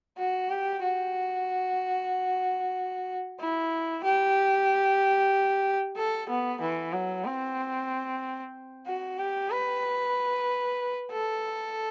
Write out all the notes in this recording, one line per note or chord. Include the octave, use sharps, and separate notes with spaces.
F#4
G4
F#4
E4
G4
A4
B3
E3
F#3
C4
F#4
G4
B4
A4